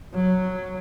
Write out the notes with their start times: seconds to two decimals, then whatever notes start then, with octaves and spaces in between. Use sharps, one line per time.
0.14 F#3